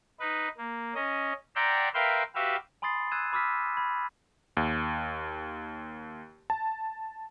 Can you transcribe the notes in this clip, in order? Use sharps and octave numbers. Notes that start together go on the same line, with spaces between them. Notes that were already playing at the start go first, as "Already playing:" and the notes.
D#4 B4
A#3
C#4 D#5
D5 E5 F#5 G5 A#5 C6
A#4 B4 E5 F5 G5 C6
F#4 G4 B4 E5 F5
G#5 B5 C6 D#6 A6 C7
E6 F#6 G#6 D#7 E7
B5 D6 E6 F6 B6
B5 G#6
D#2
A5